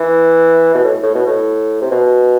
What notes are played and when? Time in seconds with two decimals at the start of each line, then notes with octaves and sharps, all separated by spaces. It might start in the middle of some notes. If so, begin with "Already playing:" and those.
Already playing: E3
0.75 B2
0.84 A2
1.03 A2
1.15 B2
1.26 A2
1.81 C3
1.91 B2